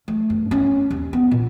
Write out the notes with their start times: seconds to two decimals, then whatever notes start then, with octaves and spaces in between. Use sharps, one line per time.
0.08 A3
0.30 G2
0.51 C#4
0.91 D#2
1.13 B3
1.31 A#2